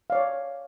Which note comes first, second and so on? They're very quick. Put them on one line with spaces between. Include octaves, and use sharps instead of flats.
F5 D5 C#5